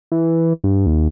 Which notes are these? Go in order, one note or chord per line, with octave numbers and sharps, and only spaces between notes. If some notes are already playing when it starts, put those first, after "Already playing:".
E3
G2
D#2